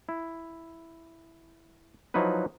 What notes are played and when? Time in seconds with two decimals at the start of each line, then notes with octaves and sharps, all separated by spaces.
0.09 E4
2.14 F3 F#3 D#4 E4 B4